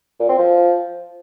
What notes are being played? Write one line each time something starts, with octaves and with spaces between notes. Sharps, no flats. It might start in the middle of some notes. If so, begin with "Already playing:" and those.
A#2
C4
F3